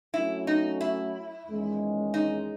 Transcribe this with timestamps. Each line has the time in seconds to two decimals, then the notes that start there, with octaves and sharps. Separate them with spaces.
0.13 F#3 A3 C#4 E4
0.47 D#4
0.81 E4
1.47 E2 D#3 G#3 C#4
2.14 D#4